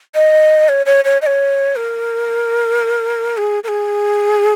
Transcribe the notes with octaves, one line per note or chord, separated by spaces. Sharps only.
D#5
C#5
C#5
C#5
D#5
C#5
A#4
G#4
A#4
G#4